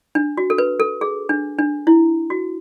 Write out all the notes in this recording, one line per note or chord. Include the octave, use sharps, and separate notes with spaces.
D4
F#4
A4
B4
A4
G#4
D4
D4
E4
F#4